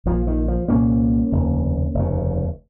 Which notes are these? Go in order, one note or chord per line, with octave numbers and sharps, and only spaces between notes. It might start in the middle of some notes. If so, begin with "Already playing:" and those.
A#1 A#2 F3
D#3
F3
C2 A#2 A#3 C#4
F1 D#2 C#3
F1 D#2 C#3